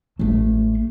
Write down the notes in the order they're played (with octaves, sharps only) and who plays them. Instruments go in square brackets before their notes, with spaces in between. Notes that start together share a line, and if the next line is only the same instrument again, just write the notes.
[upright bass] A1 A3